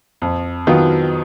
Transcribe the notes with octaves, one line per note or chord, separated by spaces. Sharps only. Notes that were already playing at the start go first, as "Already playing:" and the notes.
F2
D#3 F#3 B3 F4